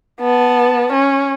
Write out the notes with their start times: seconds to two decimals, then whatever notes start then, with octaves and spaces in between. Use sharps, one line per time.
0.21 B3 A5
0.93 C#4